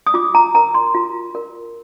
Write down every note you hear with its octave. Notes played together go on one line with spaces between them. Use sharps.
D#6
F4 D6
A#5
A#4 A#5
C6
F4
A#4